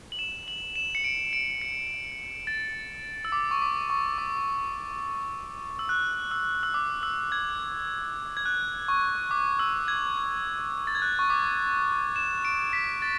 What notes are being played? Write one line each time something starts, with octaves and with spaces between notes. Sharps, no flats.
F#7
E7
F#7
E7
C#7
D7
D7
C#7
A6
E6
D6
C#6
D6
C#6
D6
E6
F#6
E6
E6
D6
E6
G#6
G#6
F#6
C#6
D6
E6
G#6
A6
G#6
F#6
C#6
D6
E7
D7
B6
A6